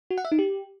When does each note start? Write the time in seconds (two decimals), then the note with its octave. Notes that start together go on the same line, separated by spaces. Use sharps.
0.11 F#4
0.18 F#5
0.25 E5
0.32 D#4
0.39 G4